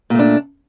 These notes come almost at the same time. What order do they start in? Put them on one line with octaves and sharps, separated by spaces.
A#2 A3 D4